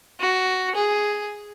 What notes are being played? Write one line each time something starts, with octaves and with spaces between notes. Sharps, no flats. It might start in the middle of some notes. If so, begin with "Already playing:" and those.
F#4
G#4